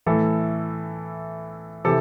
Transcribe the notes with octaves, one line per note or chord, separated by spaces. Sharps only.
A2 E3 A4
C3 E3 A4